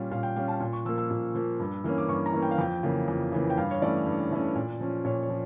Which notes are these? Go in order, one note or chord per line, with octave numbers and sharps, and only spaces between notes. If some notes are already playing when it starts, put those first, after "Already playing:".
Already playing: A#2 G3 C#4 F5
A#2 F5
G5
G3 C#4 F5
A5
A#2
C#6
F3 A#3 E6
E6
A#2
F3 A#3
G2
E3 A#3 C#4
D6
G2 C#6
A#5
E3 A#3 C#4
G5
F5
F2 G5
C#3 E3 A#3
F2
C#3 E3 A#3
G5
G2 F5
C#5
E3 A3 C#4 D5
G2
E3 A3 C#4
A#2
F3 C#4
A#2 C#5
C#5
F3